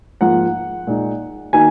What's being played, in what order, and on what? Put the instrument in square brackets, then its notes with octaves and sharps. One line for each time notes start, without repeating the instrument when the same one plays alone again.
[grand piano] G#2 F3 A#3 F4 [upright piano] F#5
[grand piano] A#2 G#3 D#4
[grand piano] D#3 A#3 D#4 F#4 [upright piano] G#5